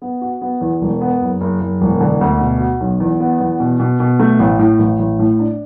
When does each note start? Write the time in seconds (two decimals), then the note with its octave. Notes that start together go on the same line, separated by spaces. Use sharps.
0.02 B3
0.21 F#4
0.41 B3
0.61 E2
0.82 E1
1.01 B3
1.21 F#1
1.41 F#1
1.60 F#1
1.81 E1
2.01 D3
2.21 D2
2.41 B2
2.60 F#4
2.80 B1
3.00 E2
3.20 B3
3.40 E2
3.60 B2
3.80 B2
4.00 B2
4.20 A3
4.39 A1
4.59 A2
4.79 A1
4.99 A1
5.19 A2
5.39 D4